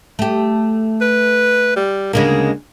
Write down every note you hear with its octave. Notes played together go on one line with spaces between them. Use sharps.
A3 G4
B4
G3
D2 C#3 G#3 A#3